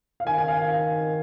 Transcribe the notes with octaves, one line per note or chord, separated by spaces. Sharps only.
F5
D#3 G#5
G#5
F5